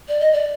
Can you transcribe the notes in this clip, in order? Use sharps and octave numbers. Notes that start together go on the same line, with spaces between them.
D5
D#5
D5